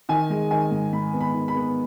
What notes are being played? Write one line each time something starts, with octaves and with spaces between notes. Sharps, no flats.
D#3 G#5
G#3
D#3 G#5
G#2
G#2 B5
B3
B5
D#3
B5
B3